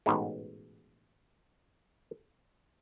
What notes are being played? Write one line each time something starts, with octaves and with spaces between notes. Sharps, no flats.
A1 G#2 B2 G#3